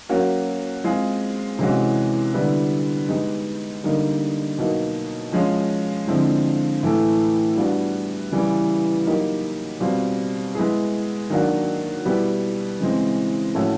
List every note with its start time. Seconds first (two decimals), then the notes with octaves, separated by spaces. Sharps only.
0.09 F#3 A#3 C#4 F#4
0.84 G#3 C4 F4 G#4
1.59 C3 E3 G#3 C#4 F#4
2.33 D3 G3 B3 E4
3.09 G#3 B3 D#4 G4
3.83 D3 G3 A#3 D#4
4.58 B2 F#3 A#3 D#4
5.32 F3 G#3 C#4 F4
6.08 D3 F3 G#3 C4 E4
6.83 A2 E3 A3
7.56 G3 B3 D4 F#4
8.32 C#3 E3 G3 B3
9.06 F#3 A#3 D#4 G4
9.80 B2 G3 C4 F4
10.55 G#3 B3 E4 G#4
11.30 D#3 F#3 A#3 D4 F#4
12.05 B2 G3 B3 E4 G4
12.80 C#3 E3 G#3 C4
13.55 A2 F3 A3 C#4 F#4